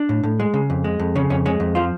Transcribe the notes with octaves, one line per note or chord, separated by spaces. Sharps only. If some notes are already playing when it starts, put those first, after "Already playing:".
Already playing: D4
A2
A2
G#3
C#3
F2
G#3
F2
C#3 C#4
F2 C#4
G#3 C#4
F2
F3 F4